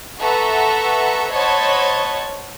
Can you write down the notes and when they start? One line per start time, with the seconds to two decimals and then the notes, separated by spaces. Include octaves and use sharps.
0.21 A4 B4 E5 F#5 A#5 C#6
1.32 C5 C#5 D#5 F#5 A5 B5